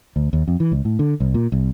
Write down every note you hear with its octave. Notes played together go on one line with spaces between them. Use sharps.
D2
D#2
F2
E3
C#2
A2
D3
C2
A#2
C2